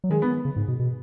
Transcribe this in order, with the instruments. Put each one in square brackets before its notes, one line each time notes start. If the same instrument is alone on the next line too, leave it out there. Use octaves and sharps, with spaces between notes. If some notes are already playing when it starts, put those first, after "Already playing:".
[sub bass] F#3
[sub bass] D#3 [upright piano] G#3
[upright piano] B3
[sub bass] C#3
G#2
B2
B2